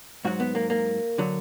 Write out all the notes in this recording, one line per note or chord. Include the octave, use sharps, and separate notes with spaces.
G#2 F#3 F#4
B3
A#3
A#3
D3 F#3